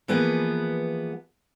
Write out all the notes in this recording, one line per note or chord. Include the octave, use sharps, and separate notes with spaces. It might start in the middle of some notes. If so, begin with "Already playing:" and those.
E3 F3 A#3 B3 G#4 B4